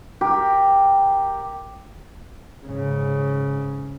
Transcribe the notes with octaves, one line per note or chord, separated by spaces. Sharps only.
G4 A#4
G#2 C#3